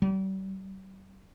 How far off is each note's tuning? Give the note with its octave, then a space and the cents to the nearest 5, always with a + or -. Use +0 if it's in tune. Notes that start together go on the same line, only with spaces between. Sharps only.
G3 -40